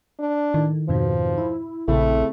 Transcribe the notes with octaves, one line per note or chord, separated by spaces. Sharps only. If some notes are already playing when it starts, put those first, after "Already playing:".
D4
A2 D#3
F2 G#2 B2 F3
E4
A#1 C#3 A3 C4 E4